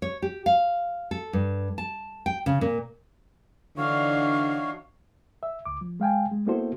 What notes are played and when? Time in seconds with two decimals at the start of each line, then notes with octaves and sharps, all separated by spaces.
0.02 C#5
0.22 G4
0.46 F5
1.11 A4
1.33 G2
1.78 A5
2.26 G5
2.46 C#3
2.61 A#2
3.77 D3 E3 D4 D#4 F#4 C#5 F5
5.43 E5
5.66 C#2 D6
5.81 F3
6.00 G#3 F5 G5 G#5
6.31 G#3
6.46 A#3 B3 E4 F#4 A4 C5